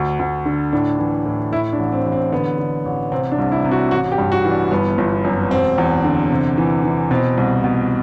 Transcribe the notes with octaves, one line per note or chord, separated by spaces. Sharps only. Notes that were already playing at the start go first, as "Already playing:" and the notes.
Already playing: D2
D2
D3
A2 D4
E3
A2
A2 E4
D4
A1
C4
A1
C4
D3 B3
D3
A1
C3 C4
D4
C2
E4
C3
F#4
A1 F#4
G4
G2
F#4
E3
D4
G1 B3
G1
F#2
E1 C4
E2
D3
C3
E3
E3
B2 C4
C2
B2